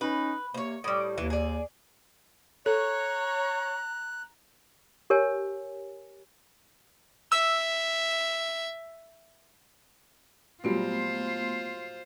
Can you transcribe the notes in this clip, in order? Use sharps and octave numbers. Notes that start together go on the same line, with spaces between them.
C#4 D#4 B4
C3 A#3 C5 C#5
A2 G3 D6 D#6
D#2 E3
G#4 D5
A4 C#5 A#5 F#6
G4 A#4 C#5 G#5
E5 E6
A#2 F#3 G3 A3 B3 F4 C5 C6